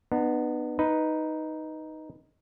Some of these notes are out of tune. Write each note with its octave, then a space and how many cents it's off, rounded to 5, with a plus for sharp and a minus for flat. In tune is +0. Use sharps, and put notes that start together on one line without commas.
B3 +0 D#4 -45
D#4 +5 B4 +0